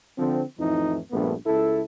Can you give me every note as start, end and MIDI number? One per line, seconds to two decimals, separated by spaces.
0.17 0.43 50
0.17 0.43 53
0.17 0.43 60
0.59 0.99 41
0.59 0.99 45
0.59 0.99 52
0.59 0.99 63
1.11 1.34 34
1.11 1.34 43
1.11 1.34 57
1.11 1.34 59
1.46 1.82 37
1.46 1.82 64
1.46 1.82 69